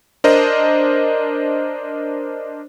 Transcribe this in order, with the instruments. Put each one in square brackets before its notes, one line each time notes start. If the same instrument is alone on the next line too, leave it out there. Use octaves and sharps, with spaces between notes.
[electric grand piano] D4 A#4 C5 D#5